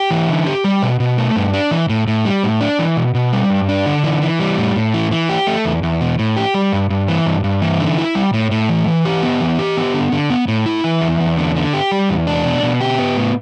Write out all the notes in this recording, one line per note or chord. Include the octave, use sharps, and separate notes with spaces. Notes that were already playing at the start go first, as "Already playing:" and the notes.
Already playing: G4
E3
D3
G4
G3
B2
B2
A3
G2
D4
E3
A2
A2
G3
A2
D4
E3
B2
B2
G3
G2
D4
D3
E3
E3
G3
A2
A2
E3
E3
G4
A3
E2
E2
B2
A2
G4
G3
G2
G2
E3
G2
G2
E3
D3
E4
G3
A2
A2
E3
E3
G4
B3
E3
G4
B3
D3
D3
B3
A2
E4
E3
E2
E2
D3
D3
G4
G3
E2
D4
B2
B2
G4
B3
A2